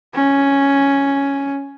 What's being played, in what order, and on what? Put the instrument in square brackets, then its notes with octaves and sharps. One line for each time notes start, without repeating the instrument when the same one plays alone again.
[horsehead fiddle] C#4